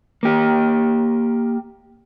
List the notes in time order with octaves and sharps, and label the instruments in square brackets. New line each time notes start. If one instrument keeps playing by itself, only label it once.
[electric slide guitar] A#3 G4